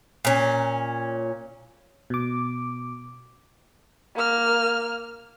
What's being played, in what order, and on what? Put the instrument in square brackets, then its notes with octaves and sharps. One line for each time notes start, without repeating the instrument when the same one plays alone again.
[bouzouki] A#2 C#4
[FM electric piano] B2 D6
[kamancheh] A#3 F6